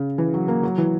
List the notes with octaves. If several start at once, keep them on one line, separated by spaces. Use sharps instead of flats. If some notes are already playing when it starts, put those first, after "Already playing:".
Already playing: C#3
E3
F#3
A#3
F#3
E3